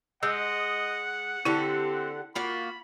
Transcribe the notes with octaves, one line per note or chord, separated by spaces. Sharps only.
G#3 D#5 F#5 E6 G6
D3 C4 E4 G4 A4
A#3 F4 F#4 B5